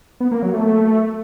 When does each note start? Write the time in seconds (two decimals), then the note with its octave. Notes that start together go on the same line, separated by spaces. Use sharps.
0.20 B3
0.31 A#3
0.43 F#3
0.54 A3